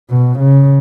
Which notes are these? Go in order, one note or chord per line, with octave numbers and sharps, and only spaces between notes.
B2
C#3